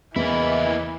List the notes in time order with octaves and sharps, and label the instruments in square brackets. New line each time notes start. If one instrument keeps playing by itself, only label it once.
[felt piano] E2 [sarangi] E3 [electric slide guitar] A#3 E4 [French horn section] D#5